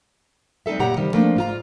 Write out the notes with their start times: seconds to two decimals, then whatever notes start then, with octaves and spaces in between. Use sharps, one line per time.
0.66 G3 C4 D#4 A4 E5
0.79 F#2 A#2 C#3 G4 F#5 A#5
0.96 C3 D#3 G3
1.13 F3 A3 A#3 C4 D4
1.36 G#2 F4 A#5